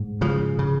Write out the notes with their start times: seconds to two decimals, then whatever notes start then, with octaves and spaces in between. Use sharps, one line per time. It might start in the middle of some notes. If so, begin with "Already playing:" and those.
Already playing: G#2
0.21 C#3 F3
0.59 C#3